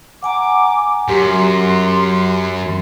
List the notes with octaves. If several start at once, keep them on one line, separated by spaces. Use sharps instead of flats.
F#5 G#5 A#5 D6
F#2 F#3 G4 C6